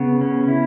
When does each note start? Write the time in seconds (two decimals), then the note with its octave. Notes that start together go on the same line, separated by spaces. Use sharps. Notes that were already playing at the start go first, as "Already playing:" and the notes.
Already playing: C#3 B3
0.21 C#4
0.48 E4